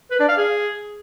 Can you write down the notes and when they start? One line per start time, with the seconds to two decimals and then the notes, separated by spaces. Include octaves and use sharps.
0.11 B4
0.20 D4
0.29 F5
0.38 G#4